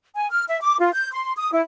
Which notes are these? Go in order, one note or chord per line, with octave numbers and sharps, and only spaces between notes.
G#5
F6
E5
D6
F4
G6
C6
D#6
E4